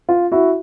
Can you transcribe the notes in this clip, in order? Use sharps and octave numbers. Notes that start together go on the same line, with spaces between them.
F4
E4 F#4